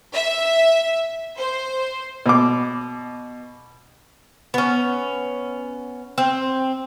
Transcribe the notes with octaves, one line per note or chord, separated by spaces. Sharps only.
E5
C5
B2 D6
B3 C#4
C4